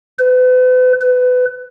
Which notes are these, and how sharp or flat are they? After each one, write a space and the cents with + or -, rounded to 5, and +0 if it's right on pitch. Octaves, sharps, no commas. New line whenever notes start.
B4 +40
B4 +25